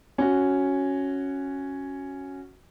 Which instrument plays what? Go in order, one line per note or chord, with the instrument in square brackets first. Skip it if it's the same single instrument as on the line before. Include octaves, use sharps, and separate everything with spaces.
[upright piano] C#4 F#4